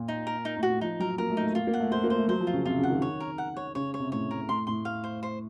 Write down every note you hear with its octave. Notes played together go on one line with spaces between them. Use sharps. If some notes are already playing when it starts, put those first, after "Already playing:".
Already playing: A#2
D#4
A#4
D#4
A2
F#4
A2
F3 D#4
F#3 A#4
A#3 A#4
A3
D#4
A3
A#3 F4
A#3
F#5
A3
A3 C5
A#3
C5
A3
F#3 C5
F3
F4
C#3
C3 F4
C#3
F#5
D#3
C#5
A#4
F#5
C#5
C#3 C#5
C#5
C3
A2 C#5
A#4
A2 C6
A2 C6
F5
C5
C5